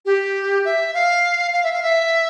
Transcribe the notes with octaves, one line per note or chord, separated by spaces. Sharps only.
G4
E5
F5
F5
E5
F5
E5